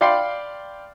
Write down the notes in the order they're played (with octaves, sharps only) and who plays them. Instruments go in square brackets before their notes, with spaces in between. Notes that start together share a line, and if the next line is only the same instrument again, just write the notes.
[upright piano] D5 F5 G5 B5 C6 C7